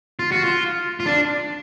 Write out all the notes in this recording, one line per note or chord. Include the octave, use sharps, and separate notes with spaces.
F4
F#4
F4
F4
D4